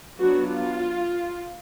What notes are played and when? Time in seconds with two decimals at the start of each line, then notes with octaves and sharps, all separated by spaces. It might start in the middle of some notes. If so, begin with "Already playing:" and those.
0.19 F#3 B3 D4 F#4
0.51 F4